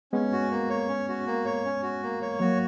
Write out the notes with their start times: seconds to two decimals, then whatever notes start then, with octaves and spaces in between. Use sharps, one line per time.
0.13 G#3 B3 C#4
0.33 F#4
0.51 A#3
0.70 C#5
0.88 C#4
1.08 F#4
1.27 A#3
1.45 C#5
1.65 C#4
1.83 F#4
2.03 A#3
2.22 C#5
2.40 F#3 A#3 F#4